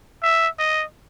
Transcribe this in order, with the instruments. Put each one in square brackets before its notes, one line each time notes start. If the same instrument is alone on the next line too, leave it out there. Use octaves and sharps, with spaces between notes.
[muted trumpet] E5
D#5